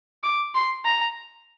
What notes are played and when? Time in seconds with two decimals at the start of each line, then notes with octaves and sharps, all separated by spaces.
0.23 D6
0.55 C6
0.85 A#5